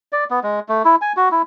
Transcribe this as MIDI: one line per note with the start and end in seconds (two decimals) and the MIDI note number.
0.13 0.24 74
0.30 0.40 59
0.43 0.60 56
0.69 0.83 57
0.85 0.96 64
1.01 1.13 80
1.17 1.29 66
1.32 1.42 64